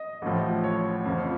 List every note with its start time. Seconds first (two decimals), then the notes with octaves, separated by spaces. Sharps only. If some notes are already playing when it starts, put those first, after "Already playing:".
Already playing: D#5
0.22 A1 A2 F3
0.64 C#5
1.05 F2 C#3 F3